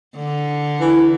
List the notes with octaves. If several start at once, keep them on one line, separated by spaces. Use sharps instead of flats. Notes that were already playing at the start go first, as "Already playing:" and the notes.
D3
E3